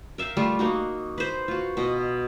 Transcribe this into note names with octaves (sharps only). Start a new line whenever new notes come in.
A#4 E5 F5 G5
G3 A3 F4
A#3 D#4 F#4
B4 C5
F4 F#4
B2 D#5